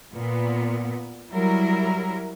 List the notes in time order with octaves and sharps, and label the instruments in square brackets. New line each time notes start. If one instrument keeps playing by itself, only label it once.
[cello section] A#2 B3
F#3 G3 E4 A#4